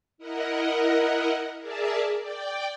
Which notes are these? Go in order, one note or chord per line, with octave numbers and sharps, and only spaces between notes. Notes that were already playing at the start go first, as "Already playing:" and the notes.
E4 A#4 D#5 F#5
G#4 A#4 D5 E5 A5
D5 G5